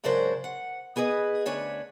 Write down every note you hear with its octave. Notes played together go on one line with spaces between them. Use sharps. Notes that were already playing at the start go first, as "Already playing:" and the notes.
G#2 C#3 F#3 D4 A#4 C5
F#5
B3 G#4 B4 D5 D#5
D2 C#4 D4 B4 C#5